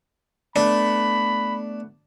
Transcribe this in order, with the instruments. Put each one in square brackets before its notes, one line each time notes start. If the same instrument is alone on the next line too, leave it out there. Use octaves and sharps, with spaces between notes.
[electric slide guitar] A3 B3 [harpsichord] D4 [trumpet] B5